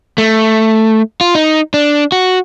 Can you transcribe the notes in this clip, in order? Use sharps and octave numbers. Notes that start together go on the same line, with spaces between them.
A3
F4
D#4
D4
F#4